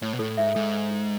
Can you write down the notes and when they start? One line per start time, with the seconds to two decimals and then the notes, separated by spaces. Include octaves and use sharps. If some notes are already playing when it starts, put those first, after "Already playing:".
0.02 A2 C#5
0.13 B2
0.19 A2 A4
0.37 G#2 E5
0.55 G#2 A4
0.74 A4
0.91 A4